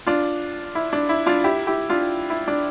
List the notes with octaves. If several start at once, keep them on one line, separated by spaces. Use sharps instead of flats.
D4 F4
E4
D4
E4
D4 F4
E4 G4
E4 G4
D4 F4
E4
D4